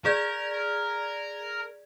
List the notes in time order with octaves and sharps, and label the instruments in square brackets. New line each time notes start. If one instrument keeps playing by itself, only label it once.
[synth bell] G#4 D5 G#6 [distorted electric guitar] A#4